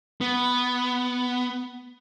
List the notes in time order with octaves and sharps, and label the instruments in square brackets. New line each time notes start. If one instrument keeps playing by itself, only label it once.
[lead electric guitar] B3